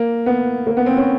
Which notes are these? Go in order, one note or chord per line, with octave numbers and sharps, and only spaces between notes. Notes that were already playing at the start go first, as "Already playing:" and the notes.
Already playing: A#3
B3
A#3
B3
C4
C#4